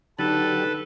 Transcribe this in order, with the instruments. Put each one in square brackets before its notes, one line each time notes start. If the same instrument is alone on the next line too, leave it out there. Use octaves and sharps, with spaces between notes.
[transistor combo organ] D3 F#3 G4 [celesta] D#4 A6 F#7 [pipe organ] A4 B4